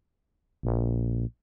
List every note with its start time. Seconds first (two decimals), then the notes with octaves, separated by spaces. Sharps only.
0.63 A#1